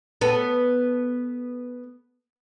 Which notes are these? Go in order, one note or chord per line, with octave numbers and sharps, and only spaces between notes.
B3 A4